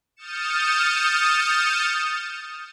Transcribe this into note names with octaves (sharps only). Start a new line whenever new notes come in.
D#6 F6 G6 A6 C#7 E7